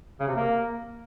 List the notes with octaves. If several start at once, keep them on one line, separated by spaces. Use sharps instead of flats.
C#3
C3
A#3